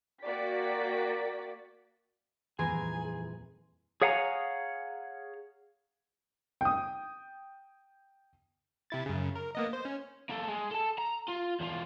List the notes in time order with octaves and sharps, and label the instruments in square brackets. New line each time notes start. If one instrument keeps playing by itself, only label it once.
[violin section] A#3 F#4 D5 G5 B6
[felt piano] D#1 F2 C6 [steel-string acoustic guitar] E3 A#5 [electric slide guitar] G#4 [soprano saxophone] G#5
[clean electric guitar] G#4 C#5 F5 F#5 G#5 A#5
[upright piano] G5 D#6
[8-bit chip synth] C3 E4 A6
F#2 C#3
A#4
A#3 B3 D#5
C5
C#4
[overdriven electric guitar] A#3 A4
G#3
A4 A5
A#5
F4
E2 F4